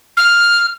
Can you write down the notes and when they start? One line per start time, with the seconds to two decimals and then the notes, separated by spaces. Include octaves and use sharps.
0.17 F6